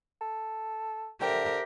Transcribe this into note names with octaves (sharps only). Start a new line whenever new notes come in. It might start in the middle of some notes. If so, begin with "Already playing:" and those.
A4
D3 G4 A#4 C5 E5 G5